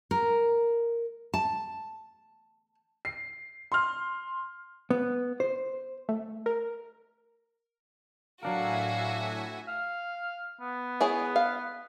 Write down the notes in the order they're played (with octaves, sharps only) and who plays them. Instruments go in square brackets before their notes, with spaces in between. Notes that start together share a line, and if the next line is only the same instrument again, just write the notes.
[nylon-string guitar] A#4
A5
[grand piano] C7
C6 F6
[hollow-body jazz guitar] B3
C5
[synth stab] A3
A#4
[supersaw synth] A2 E5 G#5 [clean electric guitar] F#3 D4 A#4 [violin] F#4 [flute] F5
[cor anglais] F5
B3
[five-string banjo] E4 G#4 C#5
F5